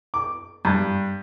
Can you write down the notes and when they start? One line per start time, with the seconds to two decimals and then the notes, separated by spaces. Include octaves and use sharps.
0.14 D6
0.65 G2